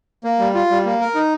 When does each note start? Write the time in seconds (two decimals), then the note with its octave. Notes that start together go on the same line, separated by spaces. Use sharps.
0.24 A#3
0.39 G3
0.55 F4
0.70 G3
0.85 A#3
1.00 A#4
1.15 D#4